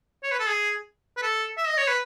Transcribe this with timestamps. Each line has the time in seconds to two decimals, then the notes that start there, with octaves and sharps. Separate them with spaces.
0.23 C#5
0.32 B4
0.40 A4
0.48 G#4
1.17 B4
1.23 A4
1.57 E5
1.68 D#5
1.78 C#5
1.88 B4